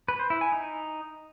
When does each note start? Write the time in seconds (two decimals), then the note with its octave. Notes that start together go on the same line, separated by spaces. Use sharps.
0.08 B4
0.19 C5
0.30 E4
0.41 G#5
0.52 D#4